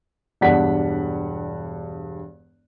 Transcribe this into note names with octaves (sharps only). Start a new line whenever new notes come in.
E1 G2 D4 F#5 B6